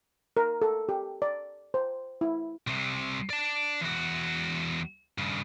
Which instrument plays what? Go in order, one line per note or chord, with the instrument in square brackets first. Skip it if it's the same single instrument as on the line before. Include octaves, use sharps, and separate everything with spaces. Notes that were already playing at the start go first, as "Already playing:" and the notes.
[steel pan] A#4
A4
G4
D5
C5
E4
[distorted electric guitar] C2 C3
D5 A5
E2 F#4
G2 C#3